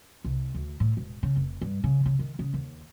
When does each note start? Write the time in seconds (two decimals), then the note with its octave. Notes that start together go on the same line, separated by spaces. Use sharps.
0.24 C2
0.54 D2
0.80 A2
0.97 E1
1.23 C#3
1.37 F1
1.61 G2
1.84 C#3
2.06 C#3
2.19 D#3
2.39 C#3
2.54 D#2